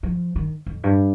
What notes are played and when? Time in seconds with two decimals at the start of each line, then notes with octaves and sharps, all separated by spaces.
0.03 F3
0.36 D#3
0.66 F2
0.84 G2